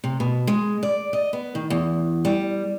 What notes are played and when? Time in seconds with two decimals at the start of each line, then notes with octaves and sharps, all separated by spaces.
0.04 C3
0.20 B2
0.47 G#3
0.83 D5
1.13 D#5
1.33 B3
1.55 D#3
1.70 E2
2.25 G3